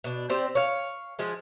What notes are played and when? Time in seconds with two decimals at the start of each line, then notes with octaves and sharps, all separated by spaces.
0.04 B2 D4
0.30 C4 G4 C5 D5
0.55 C#5 F5
1.19 F3 G#3 G#4